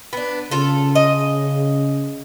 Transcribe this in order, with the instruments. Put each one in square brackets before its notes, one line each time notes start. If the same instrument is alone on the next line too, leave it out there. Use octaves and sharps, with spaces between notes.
[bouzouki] B3 D4
[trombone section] C#3 [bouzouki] F4 A4
[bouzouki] D#5